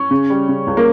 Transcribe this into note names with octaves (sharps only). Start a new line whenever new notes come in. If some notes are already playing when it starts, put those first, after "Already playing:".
Already playing: C#4
C#3
G3
C#3
C#2
A#3